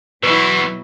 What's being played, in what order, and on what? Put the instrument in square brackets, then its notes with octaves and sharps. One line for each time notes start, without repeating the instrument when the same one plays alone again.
[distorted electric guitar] E2 E3 [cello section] B2 F#3 [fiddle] E4 C#6 [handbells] B4